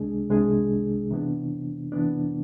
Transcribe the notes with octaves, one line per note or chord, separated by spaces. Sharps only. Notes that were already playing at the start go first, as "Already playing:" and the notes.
Already playing: C2 C3 G#3 D4 G#4
C2 C3 G#3 D4 G#4
C3 E3 B3 D4
C3 E3 B3 D4